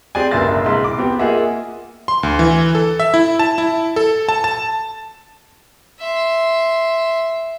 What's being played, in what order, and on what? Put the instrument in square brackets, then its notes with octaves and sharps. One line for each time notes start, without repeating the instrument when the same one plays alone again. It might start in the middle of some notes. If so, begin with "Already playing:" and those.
[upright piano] C4 G4 G#4 D5 G#5
G1 C#2 A#3 E5 C6 A6
C2 G#3 C6
E4 D6
B3 C4 G4
A#3 F4 G#4 D#5 E5 F#5
[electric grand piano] C6
D2
E3
A4
E5
E4
A5
E4
A4
A5
A5
[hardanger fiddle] E5 C6